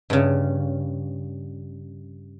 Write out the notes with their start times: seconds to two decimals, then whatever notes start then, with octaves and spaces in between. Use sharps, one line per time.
0.10 G2 C#3